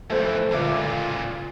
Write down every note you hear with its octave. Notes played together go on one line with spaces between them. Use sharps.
F2 E3 A3 C5
C#2 A#2 D3 F4 A4 E5 D6